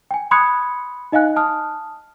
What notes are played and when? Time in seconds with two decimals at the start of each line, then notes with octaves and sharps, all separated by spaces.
0.11 G5 G#5
0.31 B5 C6 D#6 F#6 G#6 C#7
1.12 D#4 D#5 F5 G#5 F#6
1.36 A5 D#6 F6